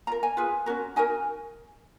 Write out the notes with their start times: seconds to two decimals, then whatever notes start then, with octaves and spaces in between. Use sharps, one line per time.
0.07 F4 A#4 A#5
0.23 G#5
0.37 F4 G#4 B4
0.66 C#4 F#4 A#4
0.96 D#4 F#4 A#4 G#5